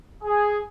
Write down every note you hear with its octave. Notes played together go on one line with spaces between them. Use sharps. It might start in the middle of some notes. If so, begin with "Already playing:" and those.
G#4